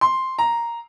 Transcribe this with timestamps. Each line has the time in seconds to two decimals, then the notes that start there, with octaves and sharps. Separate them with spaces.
0.01 C6
0.39 A#5